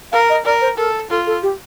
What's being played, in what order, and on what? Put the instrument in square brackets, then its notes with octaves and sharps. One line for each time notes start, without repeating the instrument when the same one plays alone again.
[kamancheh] A#4 [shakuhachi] F5
[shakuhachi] D#5
[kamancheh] A#4 [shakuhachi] D5
[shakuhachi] C5
[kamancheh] A4 [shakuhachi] A#4
[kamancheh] F4 [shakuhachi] A4
[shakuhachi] A4
G4